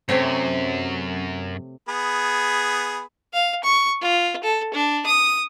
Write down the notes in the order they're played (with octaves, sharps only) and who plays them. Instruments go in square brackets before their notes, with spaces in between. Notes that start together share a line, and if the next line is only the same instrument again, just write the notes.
[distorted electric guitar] F#2 [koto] C3 A3 C#5
[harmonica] B3 G#4 B5
[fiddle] F5
C#6
F4
A4
D4
D#6